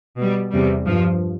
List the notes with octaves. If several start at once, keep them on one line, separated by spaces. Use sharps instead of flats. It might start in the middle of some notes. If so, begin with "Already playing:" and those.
B2 G3
E2 C3 G3
G2 F3